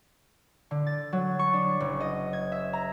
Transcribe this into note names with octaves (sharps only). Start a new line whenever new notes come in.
D3
A6
F#3
C#6
D4
F#1
D#5
G#6
E5
A#5